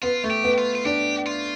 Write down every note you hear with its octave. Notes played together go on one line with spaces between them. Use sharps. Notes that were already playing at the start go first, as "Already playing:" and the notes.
B3 F4
A3
G4
B3
F4
F4
D4 G4
F4